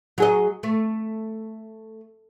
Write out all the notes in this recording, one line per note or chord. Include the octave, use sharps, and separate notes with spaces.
F#3 G#4 D#5
A3